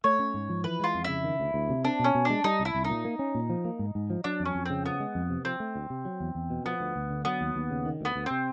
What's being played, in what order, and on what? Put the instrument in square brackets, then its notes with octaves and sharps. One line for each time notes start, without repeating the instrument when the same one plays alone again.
[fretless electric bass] A3 [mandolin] C#5
[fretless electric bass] C#4
G#2
F3
[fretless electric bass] E3 [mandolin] B4
[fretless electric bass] G#3 [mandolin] F4
[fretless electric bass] F2
[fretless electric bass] C#3 [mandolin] E4
[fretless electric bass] D#3
D2
D2
C3
[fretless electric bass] C4 [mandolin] D4
[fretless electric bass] B2
[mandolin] C#4
[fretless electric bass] B2
[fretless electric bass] G#3 [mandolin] D4
[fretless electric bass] G3 [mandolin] D#4
[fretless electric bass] C2
[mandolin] E4
[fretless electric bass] C2
[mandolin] D#4
[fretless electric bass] A#2
A#3
C#4
A#2
F3
A#3
G#2
G#2
F3
[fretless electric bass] F#3 [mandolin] D4
[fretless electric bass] F2
[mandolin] C#4
[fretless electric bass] F2
[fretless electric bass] C#3 [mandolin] C4
[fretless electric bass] F3 [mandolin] B3
[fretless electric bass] G#3
F2
C3
[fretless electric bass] F3 [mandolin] C4
[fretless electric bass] A3
D2
C3
F#3
E2
E2
B2
[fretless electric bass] F3 [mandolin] B3
[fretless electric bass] D2
D2
D3
[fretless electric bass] F#3 [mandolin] B3
[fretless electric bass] D#2
D#2
C#3
D#3
[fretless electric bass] D2 [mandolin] B3
[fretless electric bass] D2
[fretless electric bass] C3 [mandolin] C4